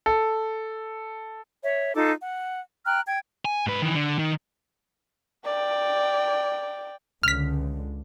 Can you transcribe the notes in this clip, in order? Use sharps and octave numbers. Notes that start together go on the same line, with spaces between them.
A4
C#5 E5
D#4 F4 A4 D6
F#5
G5 A#5 F6 F#6
G5 G#6
G#5
G#2 B4
D#3 E3
D3
D#3
D5 G5
C#2 D3 F6 B6